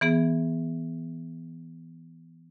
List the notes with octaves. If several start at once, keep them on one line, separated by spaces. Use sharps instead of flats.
E3 B3 G#4